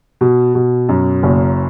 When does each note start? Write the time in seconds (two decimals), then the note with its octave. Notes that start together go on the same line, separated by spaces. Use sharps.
0.21 B2
0.55 B2
0.89 F#2
1.23 F#1